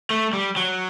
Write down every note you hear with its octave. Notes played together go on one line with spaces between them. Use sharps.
A3
G3
F#3